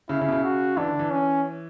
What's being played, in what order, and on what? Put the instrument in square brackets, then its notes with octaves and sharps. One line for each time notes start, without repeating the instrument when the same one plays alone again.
[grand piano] C#3 [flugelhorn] E4
[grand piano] C#3
B2
C#3
[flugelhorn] F#4
[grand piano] E3 [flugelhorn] D4
[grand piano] D3
E3
[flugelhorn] C#4